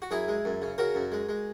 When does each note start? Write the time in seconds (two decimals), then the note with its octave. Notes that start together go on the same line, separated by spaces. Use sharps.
0.02 F#4
0.11 F#2 E4 G#4
0.28 G#3
0.45 F#2
0.62 C#3
0.78 C#3 F#4 A#4
0.95 F#2
1.12 G#3
1.29 G#3